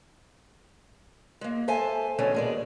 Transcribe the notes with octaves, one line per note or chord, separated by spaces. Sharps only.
G#3 A#3
A4 C5 E5 G#5 A5
B2 D3 E3 G#3 A3 C#4
A#2 G#3 D5